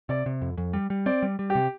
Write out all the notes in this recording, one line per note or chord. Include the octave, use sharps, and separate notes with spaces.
C3 D5
C3
F2
F2
G3
G3
C4 D5
G3
G3
G4
C3